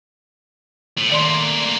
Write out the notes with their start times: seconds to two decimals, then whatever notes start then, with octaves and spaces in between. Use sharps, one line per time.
0.98 A2
1.09 D#3 A3 A#3 D5 C6